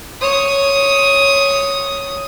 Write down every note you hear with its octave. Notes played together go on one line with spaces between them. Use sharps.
C#5 D#6